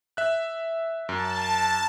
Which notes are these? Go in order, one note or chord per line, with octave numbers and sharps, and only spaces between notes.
E5 F#6
F#2 A5